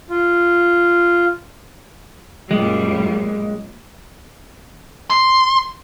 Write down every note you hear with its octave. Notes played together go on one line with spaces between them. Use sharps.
F4
F#2 A#2 G3 G#3
C6